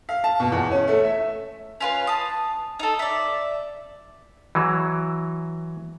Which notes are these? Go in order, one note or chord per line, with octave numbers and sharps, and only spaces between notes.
F5
A5
B2
E2
C#4
A3
E5
C#4 F4 B4
A5 D#6
D#4 A4
D5 E5
E3 F#3